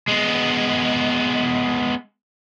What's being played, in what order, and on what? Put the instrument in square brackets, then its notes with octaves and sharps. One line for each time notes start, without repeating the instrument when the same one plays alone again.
[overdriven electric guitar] G#3 B3